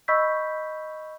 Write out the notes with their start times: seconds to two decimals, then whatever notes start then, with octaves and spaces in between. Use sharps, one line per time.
0.08 D#5 B5 C#6 E6 G6 B6